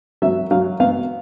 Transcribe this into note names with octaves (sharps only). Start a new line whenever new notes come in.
F#3 E5
F#3 F5
B3 F5